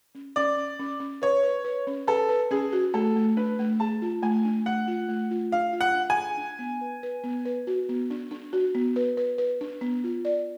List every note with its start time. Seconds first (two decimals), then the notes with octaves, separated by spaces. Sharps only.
0.15 C#4
0.36 C#4 D5
0.57 C#4
0.80 C#4
1.00 C#4
1.22 B4 C#5
1.43 B4
1.65 B4
1.87 C#4
2.08 A4 B4
2.29 B4
2.51 C#4 G#4
2.73 F#4
2.94 A3 A4
3.16 A3
3.37 D4 B4
3.59 A3
3.80 G#4 A5
4.02 F4
4.22 A3 G#5
4.45 D4
4.66 A3 F#5
4.88 F4
5.08 A3
5.31 F4
5.52 D4 F5
5.73 F4
5.81 F#5
5.94 D4
6.10 G#5
6.17 G#4
6.37 D4
6.59 B3
6.81 B4
7.03 B4
7.24 B3
7.45 B4
7.67 F#4
7.89 B3
8.10 D4
8.31 D4
8.53 F#4
8.75 B3
8.96 B4
9.17 B4
9.38 B4
9.61 D4
9.81 B3
10.04 F4
10.25 D5